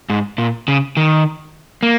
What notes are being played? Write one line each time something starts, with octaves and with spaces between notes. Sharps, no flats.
G#2
A#2
C#3
D#3
A#3